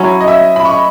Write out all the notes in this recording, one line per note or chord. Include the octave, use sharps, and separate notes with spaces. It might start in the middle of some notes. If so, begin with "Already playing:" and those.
Already playing: F#3 C#4 E4 G#5
D#5
E5
B5
C#6